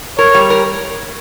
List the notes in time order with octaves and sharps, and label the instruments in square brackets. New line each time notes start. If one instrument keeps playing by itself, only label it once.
[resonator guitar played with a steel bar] A#4 [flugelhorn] C#5
[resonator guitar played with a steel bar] G3
A#4